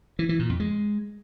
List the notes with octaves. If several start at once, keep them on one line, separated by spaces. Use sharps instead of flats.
E3
E3
A#2
F2
G#3